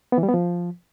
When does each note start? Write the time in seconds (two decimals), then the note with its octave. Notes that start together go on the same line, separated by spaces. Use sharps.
0.12 B3
0.18 E3
0.23 G3
0.28 B3
0.34 F3